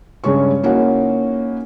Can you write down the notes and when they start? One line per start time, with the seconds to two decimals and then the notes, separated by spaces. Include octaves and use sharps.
0.24 G2 C#3 G#3 C#4 C#6
0.63 A#3 C#4 D#4 E4 F#4